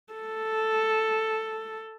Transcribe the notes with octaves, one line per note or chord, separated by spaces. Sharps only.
A4